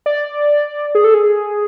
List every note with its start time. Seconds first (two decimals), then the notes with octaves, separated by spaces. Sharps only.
0.06 D5
0.95 G#4
1.04 A4
1.14 G#4